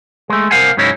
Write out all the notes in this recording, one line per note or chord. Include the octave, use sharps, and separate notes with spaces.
G#3 A3
C2 A#4 C5 F5 F#5 G#5
G#2 C#3 F#3 C#4 D#4 E4